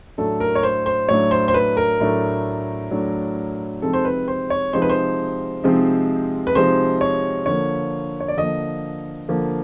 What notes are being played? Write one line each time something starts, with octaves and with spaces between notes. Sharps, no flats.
A2 F#3 A3 D4 A4
A#4
C#5
C5
C5
A2 F#3 A3 D4 C#5
C5
C5
B4
A#4
A2 F#3 A3 D4
A2 F#3 A3 D4
C3 F3 G#3 C4 D#4 A4
C5
B4
C5
C#5
C3 F3 G#3 C4 D#4 C5
B4
C5
C3 F3 G#3 C4 D#4
B4
C3 F3 G#3 C4 D#4 C5
C#5
D3 F3 A#3 C#5
C#5
D5
D3 F3 A#3 D#5
D3 F3 A#3